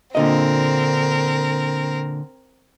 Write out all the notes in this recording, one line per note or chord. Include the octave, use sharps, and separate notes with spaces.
A#2 D3 C4 A#4 D#5